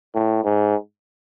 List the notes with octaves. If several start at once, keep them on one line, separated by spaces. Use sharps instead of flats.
A2
G#2